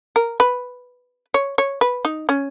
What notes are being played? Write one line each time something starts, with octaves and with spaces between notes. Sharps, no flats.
A#4
B4
C#5
C#5
B4
D#4
C#4